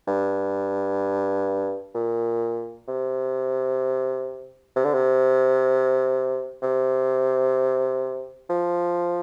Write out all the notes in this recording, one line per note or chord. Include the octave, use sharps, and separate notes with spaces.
G2
A#2
C3
C3
D3
C3
C3
F3